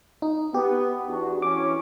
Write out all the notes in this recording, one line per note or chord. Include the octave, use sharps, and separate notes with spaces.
D#4
B3 G4
E2 D4 F#4
E3 C#4 D6